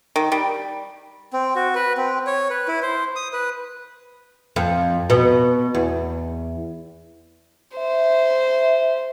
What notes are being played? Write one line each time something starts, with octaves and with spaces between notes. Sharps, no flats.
D#3
G3
C4
F#4
B4
C4
C#5
B4
E4
C5
D#6
B4
F2
B2
E2
C5 E5